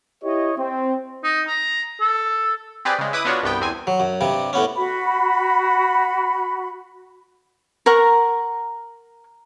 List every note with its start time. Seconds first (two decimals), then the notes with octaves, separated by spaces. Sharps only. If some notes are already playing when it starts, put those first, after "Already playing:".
0.23 E4 G4 C#5 D#5
0.57 C4
1.24 D#4
1.47 A#5
2.01 A4
2.85 C4 G4 G#4 B4 D5
2.99 C#3 G#3
3.13 E4 B4 D6 D#6
3.25 B3 D4 F4 F#4 C#5
3.43 C2 G2 B3 G5
3.61 E2 C4 G#5
3.87 F#3
4.00 F#2
4.21 G2 C3 G3
4.53 A2 B3 C#4
4.76 F#4 B5
7.86 A#4 F#5 A#5 C#6